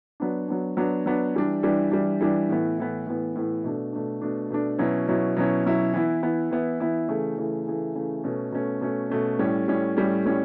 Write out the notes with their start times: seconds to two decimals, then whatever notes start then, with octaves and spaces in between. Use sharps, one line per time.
0.20 F#3 B3 D4
0.48 F#3 B3 D4
0.77 F#3 B3 D4
1.06 F#3 B3 D4
1.35 E3 G3 D4
1.63 E3 G3 D4
1.91 E3 G3 D4
2.21 E3 G3 D4
2.49 A2 E3 B3
2.78 A2 E3 B3
3.07 A2 E3 B3
3.36 A2 E3 B3
3.64 B2 A3 D4
3.93 B2 A3 D4
4.22 B2 A3 D4
4.50 B2 A3 D4
4.79 B2 F#3 C#4 E4
5.08 B2 F#3 C#4 E4
5.36 B2 F#3 C#4 E4
5.65 B2 F#3 C#4 E4
5.94 E3 B3 E4
6.23 E3 B3 E4
6.51 E3 B3 E4
6.80 E3 B3 E4
7.08 C#3 E3 A3
7.38 C#3 E3 A3
7.67 C#3 E3 A3
7.95 C#3 E3 A3
8.24 B2 A3 C#4
8.52 B2 A3 C#4
8.81 B2 A3 C#4
9.10 B2 A3 C#4
9.39 A2 G3 C#4
9.68 A2 G3 C#4
9.97 A2 G3 C#4
10.25 A2 G3 C#4